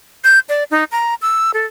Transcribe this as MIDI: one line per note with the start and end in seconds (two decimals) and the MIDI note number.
0.24 0.39 91
0.49 0.64 74
0.71 0.84 63
0.92 1.15 82
1.22 1.51 88
1.54 1.66 69